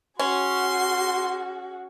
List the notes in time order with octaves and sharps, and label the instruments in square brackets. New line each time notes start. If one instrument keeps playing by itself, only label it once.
[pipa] C#4 [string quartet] F#4 G#4 [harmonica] C6